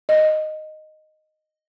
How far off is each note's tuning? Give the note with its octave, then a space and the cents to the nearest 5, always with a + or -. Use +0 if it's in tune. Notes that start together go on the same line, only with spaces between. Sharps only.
D#5 -5